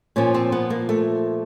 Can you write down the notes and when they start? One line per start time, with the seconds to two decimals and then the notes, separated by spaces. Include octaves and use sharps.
0.16 A#2 F3 C#4
0.34 C4
0.52 B3
0.70 A#3
0.89 A3